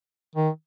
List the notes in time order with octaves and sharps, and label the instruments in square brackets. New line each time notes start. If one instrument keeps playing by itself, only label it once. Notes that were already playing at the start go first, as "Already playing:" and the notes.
[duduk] D#3